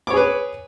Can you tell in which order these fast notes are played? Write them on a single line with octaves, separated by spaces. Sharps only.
D6 C#5 G#4 B4